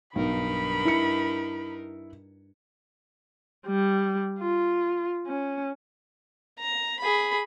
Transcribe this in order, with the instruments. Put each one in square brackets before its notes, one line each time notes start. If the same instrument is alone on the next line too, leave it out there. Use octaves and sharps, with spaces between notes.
[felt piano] B1 [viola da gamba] G2 D#4 A#4 [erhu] B5
[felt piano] E4 C#7
[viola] G3
F4
C#4
[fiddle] A#5
G#4 B5